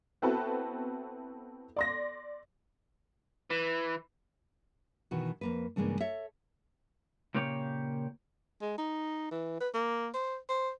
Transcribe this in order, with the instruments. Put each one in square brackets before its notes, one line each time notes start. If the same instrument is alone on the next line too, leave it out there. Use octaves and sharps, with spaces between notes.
[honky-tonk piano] B3 C4 E4 F#4 A4 B4
D5 C6 A#6
[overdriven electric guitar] E3
[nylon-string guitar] B2 D#3 E3 F#4
F2 A#3 B4
G2 C#3 E3 G#3 A#3 D4
A4 C#5 E5
[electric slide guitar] A#2 C#3 A#3 G4 C#5
[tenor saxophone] G#3
D#4
E3
B4
A#3
C5
C5